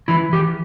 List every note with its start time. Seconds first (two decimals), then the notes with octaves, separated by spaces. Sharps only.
0.08 E3 E4
0.33 E3 G4